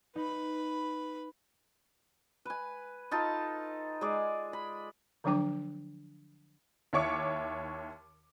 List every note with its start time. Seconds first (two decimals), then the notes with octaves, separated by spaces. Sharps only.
0.16 D#4 B4 B5
2.45 B4 G#5
3.11 D#4 F4 A4 A5
4.01 G#3 G#4 D5
4.53 B5
5.24 D3 F3 F#3 D4 G5 D6
6.93 D#2 E4 C#5 C#6 D6 C#7